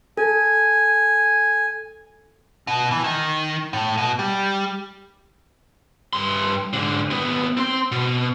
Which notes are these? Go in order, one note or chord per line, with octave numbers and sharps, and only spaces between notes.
A4 G#5
B2
E3
D#3
A2
B2
G3
G2 C6
G#2 D3
D#2 B3
C4 C6
B2